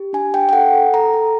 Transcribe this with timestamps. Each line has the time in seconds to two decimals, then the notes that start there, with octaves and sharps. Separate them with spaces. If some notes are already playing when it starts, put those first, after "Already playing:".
Already playing: G4
0.13 D4 G#5
0.34 D4 G5
0.49 G5
0.53 A4 F#5
0.73 A4
0.94 A4 A#5
1.14 A4